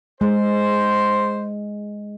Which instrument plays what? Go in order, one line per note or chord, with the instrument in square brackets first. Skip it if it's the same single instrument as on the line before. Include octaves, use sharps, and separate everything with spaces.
[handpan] G#3 [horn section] C5